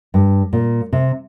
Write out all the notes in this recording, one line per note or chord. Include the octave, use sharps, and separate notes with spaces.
G2
A#2
C3